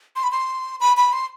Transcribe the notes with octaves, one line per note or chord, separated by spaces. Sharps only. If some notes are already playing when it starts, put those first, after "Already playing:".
C6
B5
C6
B5
B5
C6